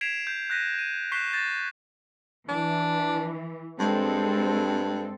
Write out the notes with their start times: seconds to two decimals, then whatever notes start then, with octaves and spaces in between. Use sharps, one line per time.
0.01 G#6 B6 C7 D7 E7 F7
0.27 G6 C7
0.50 F#6 G6 A#6 B6 D#7
0.74 G6 D#7
1.12 C#6 F#6 B6 C7 E7 G7
1.33 G6 A6 A#6 E7
2.49 E3 D4
3.79 G2 G#3 C4 A4